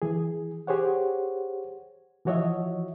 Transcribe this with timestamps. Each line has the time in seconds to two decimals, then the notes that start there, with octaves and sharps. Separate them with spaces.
0.02 E3 G#4
0.67 G4 G#4 C5 C#5 F#5
2.25 E3 F3 F#4 C#5 D#5 E5